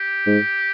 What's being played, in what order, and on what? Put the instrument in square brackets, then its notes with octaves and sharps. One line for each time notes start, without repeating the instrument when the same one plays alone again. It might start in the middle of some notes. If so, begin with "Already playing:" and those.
Already playing: [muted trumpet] G4
[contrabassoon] G#2